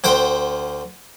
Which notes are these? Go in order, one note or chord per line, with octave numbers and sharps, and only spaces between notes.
D2 C5 F#5 G5